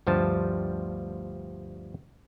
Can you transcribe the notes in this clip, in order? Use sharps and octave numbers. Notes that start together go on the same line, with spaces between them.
D2 G2 F3 G3 C5 A5